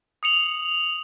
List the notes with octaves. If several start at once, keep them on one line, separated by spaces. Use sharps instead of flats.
D#6 C#7 F7 F#7